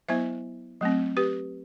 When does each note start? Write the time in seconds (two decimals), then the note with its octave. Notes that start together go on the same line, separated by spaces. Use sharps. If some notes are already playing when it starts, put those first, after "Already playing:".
0.09 F#3 B3 E4 C5 E5
0.81 F#3 A3 C4
1.17 G4 B4